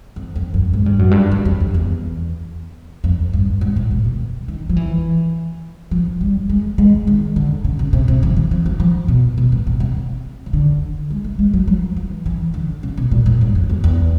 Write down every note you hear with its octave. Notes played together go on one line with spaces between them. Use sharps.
F2
F2
F#2
G#2
G2
F#2
G2
F#2
F2
F2
E2
F2
G2
G#2
A2
A#2
B2
D#3
F3
E3
F3
G3
G#3
G#3
D#3
D3
C#3
C#3
C3
C3
E3
E3
F3
E3
F3
B2
B2
A2
C3
C3
C#3
D3
G#3
A3
G#3
F#3
F3
E3
E3
D3
C#3
B2
A#2
A2
G2
F2
E2
E2